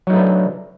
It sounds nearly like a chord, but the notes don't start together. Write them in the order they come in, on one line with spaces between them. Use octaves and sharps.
F#3 D#4 A3 B4 D4